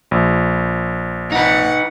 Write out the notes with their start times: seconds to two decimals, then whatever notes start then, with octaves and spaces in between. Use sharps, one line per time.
0.11 A#1
1.32 D#4 B4 F#5